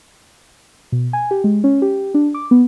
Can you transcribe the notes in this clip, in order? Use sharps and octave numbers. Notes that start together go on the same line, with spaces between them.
B2
G#5
G4
G#3
C#4
G4
D4
D6
B3